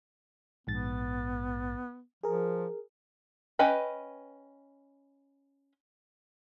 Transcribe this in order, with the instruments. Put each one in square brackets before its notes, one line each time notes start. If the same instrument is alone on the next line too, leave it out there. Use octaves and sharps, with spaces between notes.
[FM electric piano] A#1 G#2 A6 [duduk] B3
[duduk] F3 [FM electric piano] G#4 A#4
[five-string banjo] C#4 B4 D#5 G5 B5